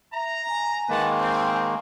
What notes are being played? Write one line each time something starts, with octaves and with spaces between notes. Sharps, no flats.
E5 A#5
G#5
D#3 G#3 A#3 B4 F#5 A5
C4